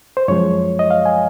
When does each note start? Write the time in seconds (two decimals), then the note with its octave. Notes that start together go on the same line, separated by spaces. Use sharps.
0.17 C5
0.28 F#2 F3 G#3 C#5
0.79 D#5
0.91 F5
1.06 G#5